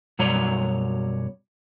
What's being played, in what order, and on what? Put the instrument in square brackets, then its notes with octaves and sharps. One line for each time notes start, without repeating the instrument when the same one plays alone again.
[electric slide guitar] F#2 B2 G3 F#4 C#5 A#5